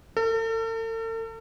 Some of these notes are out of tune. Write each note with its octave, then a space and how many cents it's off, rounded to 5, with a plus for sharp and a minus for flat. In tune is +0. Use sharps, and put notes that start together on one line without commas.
A4 +45